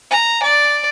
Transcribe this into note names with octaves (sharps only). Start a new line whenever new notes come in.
A#5
D5